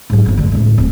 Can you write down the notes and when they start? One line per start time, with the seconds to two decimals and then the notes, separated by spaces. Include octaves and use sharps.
0.10 G#2 F#3
0.26 G1 F2
0.37 D3 A3
0.52 C#2 A2
0.78 D1 C3